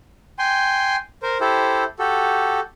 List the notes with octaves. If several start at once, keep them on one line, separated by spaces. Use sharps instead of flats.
G5 G#5 C6
A#4 C5
E4 G4 A4 C5
F#4 G4 A4